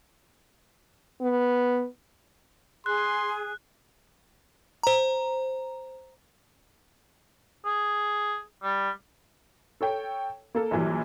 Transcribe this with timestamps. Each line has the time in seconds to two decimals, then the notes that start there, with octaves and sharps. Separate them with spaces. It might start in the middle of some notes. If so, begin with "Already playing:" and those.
1.22 B3
2.86 G#4 C6 F#6
4.83 C5 A#5
7.65 G#4
8.63 G3
9.81 A4 C#5 G5
10.55 A#3 A4
10.71 A#1 A#2 E3 F#3 G3